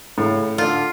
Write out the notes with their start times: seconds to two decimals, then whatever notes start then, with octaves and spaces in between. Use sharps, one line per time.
0.18 A2 C#3
0.58 D3 F4